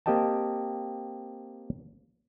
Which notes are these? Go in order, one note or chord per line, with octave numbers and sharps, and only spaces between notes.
A#3 C4 G4 D#5 G5 A5